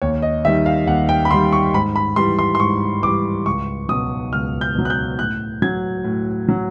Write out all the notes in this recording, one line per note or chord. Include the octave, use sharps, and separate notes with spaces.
D#2 C#5
D#5
D#3 G3 E5
F5
D#2 F#5
G5
B5
D#3 G3 C6
C#6
G#2 B5
B5
E3 G3 C6
C6
C6
G#2 C#6
E3 G3 D6
C#2 C#6
B2 F#3 D#6
C#2 F6
G6
B2 F#3
F#6
G6
A2 F#6
F#3 G#6
A2
F#3